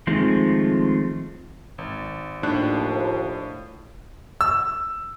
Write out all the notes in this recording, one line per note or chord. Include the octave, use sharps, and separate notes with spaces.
D#3 F3 G#3 A3 C4
G#1
D#2 A2 F3 D4 F#6
E6